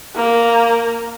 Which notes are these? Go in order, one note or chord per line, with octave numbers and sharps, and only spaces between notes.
A#3